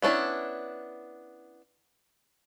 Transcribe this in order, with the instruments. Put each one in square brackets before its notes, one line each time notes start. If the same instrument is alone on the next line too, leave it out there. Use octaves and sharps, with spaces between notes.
[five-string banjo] B3 C#4 D4 E4